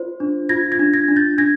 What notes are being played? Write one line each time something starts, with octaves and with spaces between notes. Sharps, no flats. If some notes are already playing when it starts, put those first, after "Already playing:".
Already playing: F4 C5
D4
F4 G#6 A#6
G#6 A#6
D4
G#6 A#6
D4
G6 A6
D4 G#6 A#6